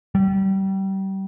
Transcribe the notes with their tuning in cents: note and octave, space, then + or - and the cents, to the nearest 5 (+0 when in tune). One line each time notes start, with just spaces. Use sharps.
G3 -30